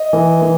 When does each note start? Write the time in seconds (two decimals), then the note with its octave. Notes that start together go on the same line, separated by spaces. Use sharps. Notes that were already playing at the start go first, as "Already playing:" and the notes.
Already playing: D#5
0.13 E3
0.42 E3